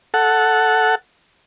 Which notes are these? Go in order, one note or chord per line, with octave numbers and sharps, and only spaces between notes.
A4 F#5